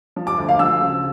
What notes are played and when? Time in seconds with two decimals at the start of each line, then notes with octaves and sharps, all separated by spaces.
0.16 F3
0.27 D6
0.38 D2
0.49 F5
0.59 F3 E6
0.81 C#3